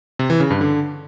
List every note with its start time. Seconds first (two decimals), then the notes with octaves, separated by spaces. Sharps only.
0.19 C3
0.30 E3
0.40 C#3
0.50 G2
0.61 D3